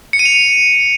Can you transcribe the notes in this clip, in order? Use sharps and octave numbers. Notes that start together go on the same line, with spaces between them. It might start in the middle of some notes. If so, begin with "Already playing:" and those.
C#7
D#7
F7